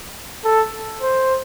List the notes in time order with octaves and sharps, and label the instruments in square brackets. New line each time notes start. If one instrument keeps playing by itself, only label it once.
[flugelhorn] A4
C5